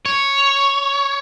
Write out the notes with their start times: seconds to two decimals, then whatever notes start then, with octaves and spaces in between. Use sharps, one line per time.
0.06 C#5